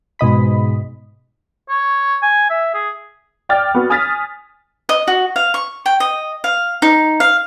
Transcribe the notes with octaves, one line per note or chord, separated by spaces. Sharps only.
G#2 B2 D#5 B5
C#5
G#5
E5
G#4
D5 G5 D6 F6 A6
B3 F#4
G#5 D#6 F6 A6 B6
D#5
F#4
F5
C#6
G5
D#5
F5
D#4
F5